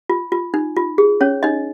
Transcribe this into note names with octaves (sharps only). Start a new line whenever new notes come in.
F4
F4
D#4
F4
G#4
C#4 C#5
D#4 D#5